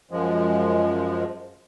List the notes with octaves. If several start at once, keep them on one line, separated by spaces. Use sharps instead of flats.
F#2 F3 G#3